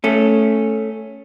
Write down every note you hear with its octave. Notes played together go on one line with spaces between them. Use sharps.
A3 C#4